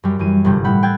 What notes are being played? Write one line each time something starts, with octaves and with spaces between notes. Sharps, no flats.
F#2 G3
F#2 E3 D#7
G1 G2 C3 G3 C5 G5
A2 E5 F#5 B5 G6
G5 C6 E6 F#6 G#6 A6